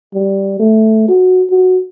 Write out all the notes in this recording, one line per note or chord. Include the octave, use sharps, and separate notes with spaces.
G3
A3
F#4
F#4